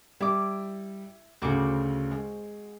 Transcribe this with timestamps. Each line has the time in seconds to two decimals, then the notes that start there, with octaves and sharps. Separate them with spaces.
0.21 G3 E4 D6
1.42 D2 C#3 C4 F#4 D6
2.11 G#3